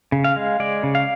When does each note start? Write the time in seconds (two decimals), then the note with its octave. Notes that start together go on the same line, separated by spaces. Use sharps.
0.12 C#3
0.24 F5
0.36 G#3
0.60 G#3 D5
0.83 C#3
0.95 F5